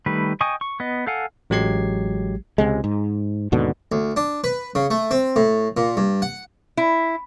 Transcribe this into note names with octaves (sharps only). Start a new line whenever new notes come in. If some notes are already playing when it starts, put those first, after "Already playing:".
D#3 G3 A3 B4
D#5 G5 G#5 C#6 D#6
C#6
B3 D#5
A4 F5 F#5 G#5
A1 F#3 G#3 G4 G#6 C7
C#2 C3 G#3
G#2
D#2 G#2 B2 D3
D2
D4
B4
C#3
A3
C4
A2
A#2
G2
F#5
E4